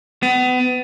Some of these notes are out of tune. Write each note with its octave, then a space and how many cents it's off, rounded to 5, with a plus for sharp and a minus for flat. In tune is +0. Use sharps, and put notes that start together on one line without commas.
B3 +30